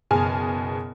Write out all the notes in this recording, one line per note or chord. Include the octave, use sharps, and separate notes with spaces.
F#1 B2 G#4 G#5 A5 F6